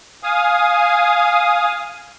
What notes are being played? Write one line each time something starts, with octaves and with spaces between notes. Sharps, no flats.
F5 G#5 D#6